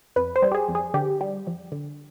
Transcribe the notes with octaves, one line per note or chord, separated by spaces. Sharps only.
F2 B4
C5
G3
G4
G#4
F2
G#4
D3 G4
G3
F2
D3